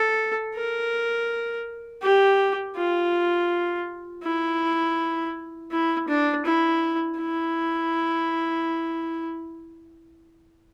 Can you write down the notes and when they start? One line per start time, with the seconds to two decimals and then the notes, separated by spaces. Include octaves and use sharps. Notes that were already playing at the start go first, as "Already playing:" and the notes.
Already playing: A4
0.55 A#4
2.02 G4
2.76 F4
4.23 E4
5.71 E4
6.08 D4
6.45 E4
7.19 E4